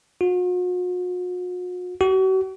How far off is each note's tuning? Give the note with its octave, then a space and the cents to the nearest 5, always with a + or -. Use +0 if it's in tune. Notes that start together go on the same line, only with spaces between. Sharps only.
F#4 -45
F#4 +40